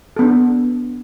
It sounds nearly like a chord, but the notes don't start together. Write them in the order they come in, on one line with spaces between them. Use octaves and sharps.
A4 B3 D4